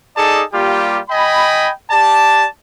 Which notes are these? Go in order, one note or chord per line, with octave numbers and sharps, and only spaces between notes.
D#4 G#4 A4 D5 A5
G3 A#3 F4 G4
D#5 G5 G#5 B5
G4 D5 A5